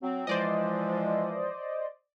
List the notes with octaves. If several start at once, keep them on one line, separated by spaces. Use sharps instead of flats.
F#3 C4
E3 F3 G#3 C5 D5 D#5